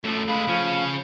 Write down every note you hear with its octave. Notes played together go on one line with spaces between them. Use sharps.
F#2 F3 A3
G#3 B4 F5 B5
C#3 F3 C#4